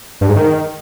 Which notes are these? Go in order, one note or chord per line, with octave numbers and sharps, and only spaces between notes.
G2
G#2
D#3